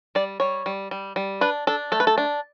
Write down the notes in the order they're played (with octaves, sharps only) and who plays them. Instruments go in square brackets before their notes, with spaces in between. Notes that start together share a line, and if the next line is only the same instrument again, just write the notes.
[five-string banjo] G3 D5
G3 C#5
G3
G3
G3
D4 B4
D4 A4
A3 A4
B4
A4
D4